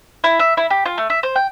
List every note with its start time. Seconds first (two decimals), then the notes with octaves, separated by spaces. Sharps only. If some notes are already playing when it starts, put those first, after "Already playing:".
0.24 E4
0.39 E5
0.57 E4
0.70 G4
0.85 F4
0.98 A3
1.10 E5
1.23 C5
1.35 G5